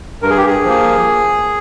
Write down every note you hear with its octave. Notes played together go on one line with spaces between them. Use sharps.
G2 A#4
G#4
G4
G#4
F3 A#3